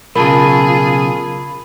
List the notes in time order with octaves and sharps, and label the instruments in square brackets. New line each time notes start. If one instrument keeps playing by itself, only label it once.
[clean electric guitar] B1 C#3 [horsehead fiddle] F4 G#4 [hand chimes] A#4 A5 [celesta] B5